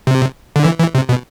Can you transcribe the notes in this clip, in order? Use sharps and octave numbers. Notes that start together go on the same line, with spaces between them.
C3
D3
E3
E3
C3
B2